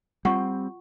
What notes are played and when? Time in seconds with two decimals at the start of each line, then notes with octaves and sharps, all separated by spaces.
0.25 G3 C4 F4 F#5 C#6